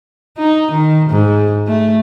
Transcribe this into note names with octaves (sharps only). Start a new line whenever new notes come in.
D#4
D#3
G#2
A3